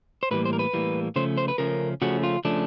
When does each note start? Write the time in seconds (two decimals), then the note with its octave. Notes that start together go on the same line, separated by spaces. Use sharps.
0.23 C5
0.31 A2 E3 G3 A#3 B4
0.45 C5
0.53 A#4
0.59 B4
0.73 A2 E3 G3 A#3
1.16 C#3 F3 A3 C#4 C5
1.38 C5
1.48 B4
1.58 C#3 F3 A3 C#4 A#4
2.02 C#3 F3 A3 C#4 F#4
2.23 F4
2.45 C#3 F3 A3 C#4 D4